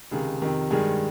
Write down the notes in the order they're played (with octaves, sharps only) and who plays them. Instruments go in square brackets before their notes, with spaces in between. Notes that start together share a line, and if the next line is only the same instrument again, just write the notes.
[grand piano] C#2 C3 D#3 G#4
F2 C3 D#3
G2 D#3 G#3 G#4